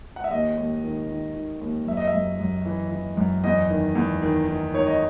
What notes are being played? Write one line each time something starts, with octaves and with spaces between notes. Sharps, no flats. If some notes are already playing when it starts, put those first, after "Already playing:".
F#5
E5
D#2 D#5
D#2
D#3
D#3
D#3
D#2
F#2 E5
D#5
E5
F#2
F#2
E3
E3
F#2
E2 D#5
D#3
E2
D#3
D#3
D#3 C#5
D#5